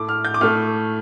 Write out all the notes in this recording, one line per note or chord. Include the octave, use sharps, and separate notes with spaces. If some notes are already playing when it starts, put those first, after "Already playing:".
Already playing: A2 A3 D6
F6
G6
D6
A2 A3 F6